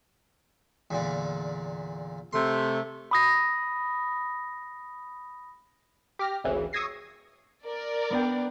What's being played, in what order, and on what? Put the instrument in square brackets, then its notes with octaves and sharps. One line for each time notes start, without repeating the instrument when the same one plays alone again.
[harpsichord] E2 A#2 D3
[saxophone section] C3 A3 [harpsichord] C6
[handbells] B5 D#6 A#6
[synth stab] G4 D6 F6 A#6
G#1 D2 C#3 E3
C#6 D#6 E6 G#6 A#6 C7
[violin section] A#4 D5
[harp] B3 D4 G5